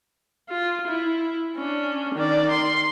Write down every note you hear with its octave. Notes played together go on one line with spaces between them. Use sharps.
F4
E4
C#4 D4
D#3 D5
C6